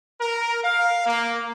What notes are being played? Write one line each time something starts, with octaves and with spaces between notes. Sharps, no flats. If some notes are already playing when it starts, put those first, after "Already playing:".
A#4
F5
A#3